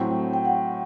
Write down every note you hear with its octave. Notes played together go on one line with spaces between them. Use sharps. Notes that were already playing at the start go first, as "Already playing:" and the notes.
Already playing: A2 F#3 C4 G5
G5
F#5